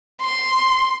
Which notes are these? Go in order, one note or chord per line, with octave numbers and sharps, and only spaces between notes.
C6